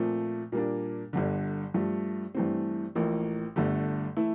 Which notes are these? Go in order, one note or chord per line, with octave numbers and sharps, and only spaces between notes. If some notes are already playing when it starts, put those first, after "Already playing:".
Already playing: A#2 F3 A3 C4
A#2 G3 A#3 D4
G1 G2 D3
G2 F3 A3
G2 E3 A3 C4
A1 A2 F3 A#3
G1 G2 D3 A3
E3 A3 E4